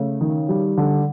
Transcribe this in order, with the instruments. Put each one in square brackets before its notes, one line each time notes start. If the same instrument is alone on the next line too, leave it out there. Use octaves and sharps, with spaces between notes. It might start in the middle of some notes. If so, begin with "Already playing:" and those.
Already playing: [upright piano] C#3 A3
D#3
G3
D3